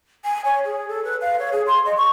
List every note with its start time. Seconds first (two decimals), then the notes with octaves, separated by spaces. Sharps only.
0.25 G#5
0.45 C#5
0.65 G#4
0.89 A4
1.04 B4
1.22 F5
1.39 C#5
1.52 G#4
1.67 C6
1.86 D#5
1.97 C#6